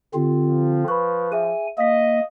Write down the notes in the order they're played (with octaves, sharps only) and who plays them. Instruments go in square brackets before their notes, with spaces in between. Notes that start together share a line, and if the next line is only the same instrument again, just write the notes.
[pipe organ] D3 C4 F4 [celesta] G4
[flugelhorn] F3
[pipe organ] B4 [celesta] B5 C#6
[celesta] G#4 E5 [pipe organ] G#5
[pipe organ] A#3 [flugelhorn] D#5 [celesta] F5 B6